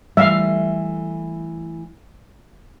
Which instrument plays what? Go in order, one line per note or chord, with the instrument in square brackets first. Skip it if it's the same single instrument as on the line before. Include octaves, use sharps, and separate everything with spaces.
[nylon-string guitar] E3 A3 [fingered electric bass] G3 [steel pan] E5 F5